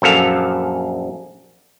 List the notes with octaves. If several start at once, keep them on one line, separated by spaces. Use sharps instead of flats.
A#1 F#2 A4 F5